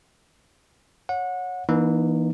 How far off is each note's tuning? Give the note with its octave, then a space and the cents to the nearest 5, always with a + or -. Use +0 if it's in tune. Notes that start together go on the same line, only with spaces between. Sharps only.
C#5 +0 F#5 -25
E3 +0 A#3 +35 D#4 -25